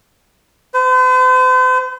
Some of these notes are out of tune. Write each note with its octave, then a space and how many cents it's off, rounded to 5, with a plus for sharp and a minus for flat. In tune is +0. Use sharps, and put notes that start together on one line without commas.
C5 -45